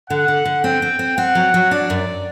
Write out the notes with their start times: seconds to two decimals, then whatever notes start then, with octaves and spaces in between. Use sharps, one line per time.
0.10 D3 F#5
0.28 D3
0.45 D3
0.64 C4 G5
0.82 C4
0.99 C4
1.18 C4 F#5
1.35 F#3
1.54 F#3
1.71 D4 D5
1.90 F#2